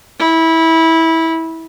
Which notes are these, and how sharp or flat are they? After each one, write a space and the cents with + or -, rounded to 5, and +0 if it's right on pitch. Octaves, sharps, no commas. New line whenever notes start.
E4 -20